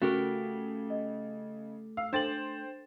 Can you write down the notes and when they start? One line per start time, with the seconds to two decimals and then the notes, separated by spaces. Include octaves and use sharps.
0.02 C#3 A3 F#4 G4 A#4
0.90 D#5
1.97 F5 E6
2.13 D4 A4 C5 G5 A6 F#7